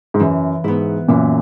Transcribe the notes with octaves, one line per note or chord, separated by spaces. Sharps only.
G#2
F#2 E3
G#2 B3 E4
F#2 A#2 E3